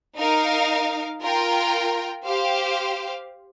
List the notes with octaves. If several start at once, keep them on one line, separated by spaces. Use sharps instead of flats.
D#4 A#4 F5
F4 A#4 G5
G4 C5 F5